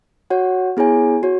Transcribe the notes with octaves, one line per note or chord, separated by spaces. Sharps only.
F#4 C#5 F#5
B3 E4 G#4 C#5 G#5
F#4 C#5